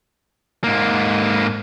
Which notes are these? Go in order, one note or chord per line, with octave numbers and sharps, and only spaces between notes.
G#2 A#3